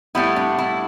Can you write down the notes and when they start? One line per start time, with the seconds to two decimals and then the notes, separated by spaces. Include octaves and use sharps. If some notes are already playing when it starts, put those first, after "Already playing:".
0.15 A2 G3 B3 E4
0.36 D4
0.58 E4